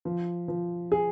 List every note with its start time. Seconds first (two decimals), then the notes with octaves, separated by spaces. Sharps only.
0.05 F3
0.48 F3
0.92 G#4